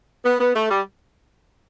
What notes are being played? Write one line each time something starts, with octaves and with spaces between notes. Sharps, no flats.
B3
B3
A3
G3